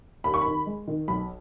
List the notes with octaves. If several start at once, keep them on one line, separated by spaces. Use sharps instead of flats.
D#2 B5
C#6
D#3 B5
G#3
D#3
B1 B5